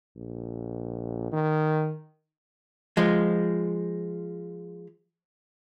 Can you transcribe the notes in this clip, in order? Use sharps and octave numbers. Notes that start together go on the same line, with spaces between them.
A#1
D#3
F3 G#3